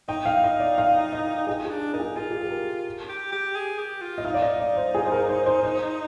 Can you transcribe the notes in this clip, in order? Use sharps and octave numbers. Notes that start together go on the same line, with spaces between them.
D#4 G5
F5
D#5
D5
F5
F5
D#5
D#4 G#4
D4 G#4
D#4 A#4
G#4
F4 G#4
G4
G#4
A#4
G4
G4
G#4
G4
F4
D#5
D#4 F5
D5
D#5
D5
C5
G#4
C5
A#4
C5
C5
C5